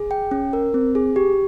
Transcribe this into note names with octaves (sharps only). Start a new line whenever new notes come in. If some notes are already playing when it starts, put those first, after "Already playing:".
Already playing: G#4
G5
C#4
A#4
C4
G#4
G4